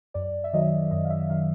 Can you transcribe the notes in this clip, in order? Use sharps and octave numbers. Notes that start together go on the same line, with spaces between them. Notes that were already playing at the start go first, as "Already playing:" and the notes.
F#2 D5
E5
D#3 F#3 D#5
F#2 D#5
F5
E5
D#3 F#3 F5